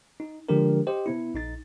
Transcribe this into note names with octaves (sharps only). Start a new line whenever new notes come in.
D#4
D3 F3 G#3 D4 G4 A#4
G4 C5 D#5
C3 B3 E4
A#1 D#4 A6